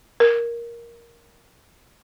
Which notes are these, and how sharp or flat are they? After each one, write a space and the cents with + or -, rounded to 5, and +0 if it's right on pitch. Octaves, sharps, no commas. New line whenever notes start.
A#4 +10